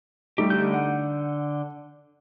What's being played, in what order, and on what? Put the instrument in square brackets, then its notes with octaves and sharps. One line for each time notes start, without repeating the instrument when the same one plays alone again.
[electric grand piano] G3 A3 D#4 [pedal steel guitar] G4
[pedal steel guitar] D3 G6
[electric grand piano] F#5